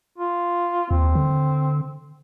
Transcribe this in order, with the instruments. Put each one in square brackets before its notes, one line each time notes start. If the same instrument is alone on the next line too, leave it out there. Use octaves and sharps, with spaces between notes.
[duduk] F4
[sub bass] D#2 [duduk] C4
[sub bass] D3